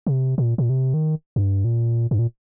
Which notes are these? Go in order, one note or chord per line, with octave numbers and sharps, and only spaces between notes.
C3
A#2
A#2
C3
D#3
F2
G2
A#2
G2
A#2